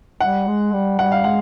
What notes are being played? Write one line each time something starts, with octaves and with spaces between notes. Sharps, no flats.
G3 F#5
G#3
G3
G3 F#5
F5
G#3 F#5